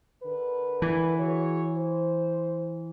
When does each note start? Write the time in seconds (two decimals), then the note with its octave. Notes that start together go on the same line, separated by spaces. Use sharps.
0.23 D3 A#4 B4
0.82 E3
1.19 F#4 G#4 C#5
1.77 C5